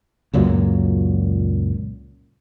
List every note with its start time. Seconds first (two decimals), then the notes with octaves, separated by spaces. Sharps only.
0.34 C#2 F#2 A#2 F#3